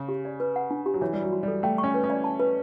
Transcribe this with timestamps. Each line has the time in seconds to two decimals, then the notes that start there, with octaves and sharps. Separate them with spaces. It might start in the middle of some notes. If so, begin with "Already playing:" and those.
Already playing: C#3
0.09 G4
0.25 D5
0.40 B4
0.56 F#5
0.71 D4
0.86 G4
0.94 F#3
1.01 E3 C#5
1.13 G3 F#4
1.23 F#3
1.32 F#4
1.43 G3 A4
1.63 A3 G5
1.78 C#6
1.84 C#4
1.94 B4
2.04 C#4
2.10 D5
2.24 A5
2.39 B4